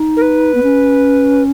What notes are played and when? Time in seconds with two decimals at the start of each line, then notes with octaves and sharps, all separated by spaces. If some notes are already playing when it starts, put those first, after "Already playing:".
Already playing: D#4
0.17 A#4
0.22 B4
0.55 B3
0.63 C#4